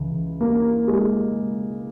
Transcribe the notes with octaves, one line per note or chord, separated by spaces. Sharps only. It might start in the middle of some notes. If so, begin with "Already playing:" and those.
Already playing: C#2 C#3 E3
A#3
G#3